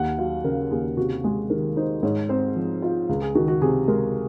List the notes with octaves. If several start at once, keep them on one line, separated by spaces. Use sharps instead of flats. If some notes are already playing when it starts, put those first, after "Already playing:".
Already playing: D#2 F#5
F#3 F5
C#3 A#4
D#2 G#4
C3 F#4
G#3 G#4
D#3 A#4
D#4 C5
G#2 C#5
C4 C5
F3
F4
C#2
G#4
D#3 F#4
F#4
C3 G#4
G#3 A#4